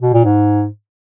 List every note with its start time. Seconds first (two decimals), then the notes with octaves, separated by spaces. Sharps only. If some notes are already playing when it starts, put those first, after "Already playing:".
0.02 B2
0.13 A#2
0.24 G#2